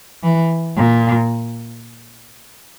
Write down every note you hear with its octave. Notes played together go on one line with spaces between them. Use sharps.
E3
A#2